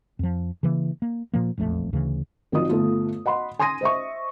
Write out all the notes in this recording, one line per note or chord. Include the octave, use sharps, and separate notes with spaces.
F2 F3
C#3 E3 A#3
A#3
A#2 F3 A#3
E1 A#1 F2 A3
D2 C#3 E3
G#1 D#3 F3 F#3 D#5 D#6
G1 A3 F4
D#5 F#5 B5 C6
G#5 C6 D#6 A#6 D#7
C5 D#5 E5 C#6